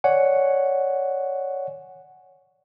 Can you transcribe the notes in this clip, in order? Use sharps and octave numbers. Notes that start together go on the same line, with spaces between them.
C#5 D5 F#5 G#5